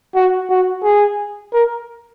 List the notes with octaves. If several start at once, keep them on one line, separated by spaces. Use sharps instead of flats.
F#4
F#4
G#4
A#4